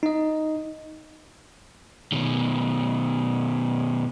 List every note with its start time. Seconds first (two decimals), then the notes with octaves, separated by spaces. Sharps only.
0.03 D#4 D#5
2.12 B2 D#3